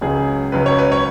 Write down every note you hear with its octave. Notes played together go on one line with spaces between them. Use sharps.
C#2 C#3 F#3 G#4
C#2 C#3 F#3 B4
C#5
B4
C#5